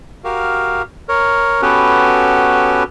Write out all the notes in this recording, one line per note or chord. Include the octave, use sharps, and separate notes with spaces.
F#4 G4 A#4 F5
A#4 C#5
B3 C#4 F#4 G4 A4 B4